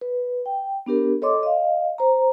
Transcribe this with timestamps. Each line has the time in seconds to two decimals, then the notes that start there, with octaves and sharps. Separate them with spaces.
0.01 B4
0.46 G5
0.86 B3 D4 G4 A#4
1.22 A4 C#5 D#5 C6 D6
1.43 D#5 F5
1.98 C5 A#5